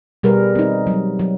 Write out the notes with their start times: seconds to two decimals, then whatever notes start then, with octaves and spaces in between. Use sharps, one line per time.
0.23 B2 G3 G#4 A#4 B4
0.55 C4 D#4
0.87 F#3 G3
1.19 F#3